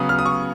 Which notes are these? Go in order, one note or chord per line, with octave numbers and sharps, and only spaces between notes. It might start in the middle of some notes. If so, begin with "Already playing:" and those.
Already playing: C#3 F#3 B3 D#6
F6
D#6
C#6